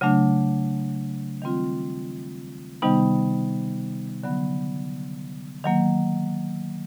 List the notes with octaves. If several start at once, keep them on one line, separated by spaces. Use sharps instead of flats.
C#3 F#3 A3 D4
D#3 G3 C4 F4
C3 D#3 G3 B3 D#4
D3 F#3 B3
D#3 F#3 A#3